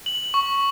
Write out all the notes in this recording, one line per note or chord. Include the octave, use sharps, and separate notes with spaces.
F#7
C#6